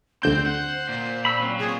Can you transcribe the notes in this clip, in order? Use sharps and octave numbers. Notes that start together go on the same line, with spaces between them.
D2 D3 C4 C5 G6
F#5
A#2
B5 E6
F#3 C4 C#4
A#2 G#4